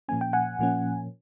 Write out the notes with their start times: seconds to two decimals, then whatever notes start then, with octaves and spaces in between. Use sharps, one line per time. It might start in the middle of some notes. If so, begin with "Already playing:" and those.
0.08 A#2 F3 A#3 C#4 G#5
0.21 G5
0.33 F#5 G#5
0.59 A#2 F3 A#3 C#4